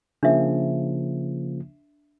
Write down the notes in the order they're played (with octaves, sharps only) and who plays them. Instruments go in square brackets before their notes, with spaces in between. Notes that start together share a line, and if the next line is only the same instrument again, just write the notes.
[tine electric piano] C#3 F3 A#3 [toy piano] D4 E5